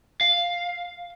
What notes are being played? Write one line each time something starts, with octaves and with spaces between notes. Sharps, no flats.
F5